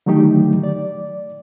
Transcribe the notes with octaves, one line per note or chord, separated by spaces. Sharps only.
D3 D#3 F#3 A3 D#4 G4
D5